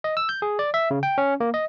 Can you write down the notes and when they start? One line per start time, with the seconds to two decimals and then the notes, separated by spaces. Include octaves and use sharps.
0.04 D#5
0.17 E6
0.29 G6
0.42 G#4
0.59 D5
0.74 E5
0.91 C#3
1.03 G5
1.18 C#4
1.40 A#3
1.54 D#5